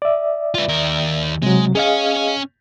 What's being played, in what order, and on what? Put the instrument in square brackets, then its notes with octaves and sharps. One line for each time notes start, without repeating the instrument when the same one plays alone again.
[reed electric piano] D5 E5
[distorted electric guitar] F4 B4
D#2 A#4
[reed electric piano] C3 F#3 [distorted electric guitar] G#3
[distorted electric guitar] C#4 C#5 [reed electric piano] G#4 D#5 F5